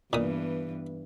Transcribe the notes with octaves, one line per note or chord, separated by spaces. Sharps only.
G2 A#2 E3 B3 D#6